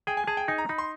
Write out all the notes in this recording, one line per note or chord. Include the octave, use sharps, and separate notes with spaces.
G#4 G5
G#5
G#4 A5
G5
D#4 G#5
A#5
D#4 B5
C6